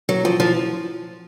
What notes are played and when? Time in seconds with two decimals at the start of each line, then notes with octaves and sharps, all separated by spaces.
0.09 F#3
0.25 F3
0.40 F3